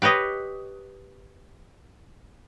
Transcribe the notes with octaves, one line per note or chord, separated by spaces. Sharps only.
G4 B4 C#5 D#5